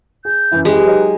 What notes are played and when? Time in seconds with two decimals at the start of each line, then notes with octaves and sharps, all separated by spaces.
0.25 G#4 G6
0.51 F#2 E3 E4
0.65 G#3 G4 B4
0.87 F#3 D#4